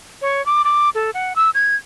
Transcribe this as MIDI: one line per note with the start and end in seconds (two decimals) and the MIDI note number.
0.22 0.44 73
0.46 0.62 86
0.64 0.90 86
0.95 1.11 69
1.14 1.35 78
1.36 1.50 88
1.55 1.75 92